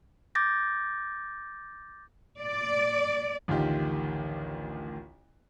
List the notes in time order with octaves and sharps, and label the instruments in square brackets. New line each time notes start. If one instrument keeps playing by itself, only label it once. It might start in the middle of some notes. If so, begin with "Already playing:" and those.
[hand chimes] D6 G6 A6 A#6
[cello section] D5
[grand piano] A1 D2 D#3 F4 G4